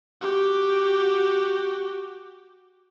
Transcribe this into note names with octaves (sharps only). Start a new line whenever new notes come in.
F#4 G4